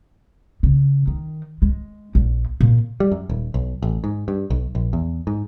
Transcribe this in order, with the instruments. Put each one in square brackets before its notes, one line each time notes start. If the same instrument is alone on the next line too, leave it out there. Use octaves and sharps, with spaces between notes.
[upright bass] C#3
D#3
G#3
A#1
A#2
[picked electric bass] G3
F#2
D#1
B1
A1
G#2
G2
B1
A#1
E2
G#2